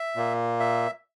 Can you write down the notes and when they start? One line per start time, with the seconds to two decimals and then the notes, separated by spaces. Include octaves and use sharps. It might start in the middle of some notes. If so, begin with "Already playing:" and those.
Already playing: E5
0.16 A#2 A#3
0.60 E5